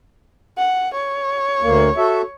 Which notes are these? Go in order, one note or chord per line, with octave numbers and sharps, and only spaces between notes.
F#5
C#5
D2 A#3
F#4 A4 E5